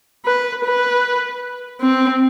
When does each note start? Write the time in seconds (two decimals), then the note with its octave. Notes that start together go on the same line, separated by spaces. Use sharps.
0.26 B4
0.65 B4
1.81 C4